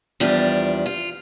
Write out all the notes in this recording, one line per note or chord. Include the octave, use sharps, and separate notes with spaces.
E2 F3 G3 D4
F4